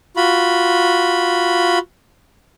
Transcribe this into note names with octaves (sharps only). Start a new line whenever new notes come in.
F4 F#4 B5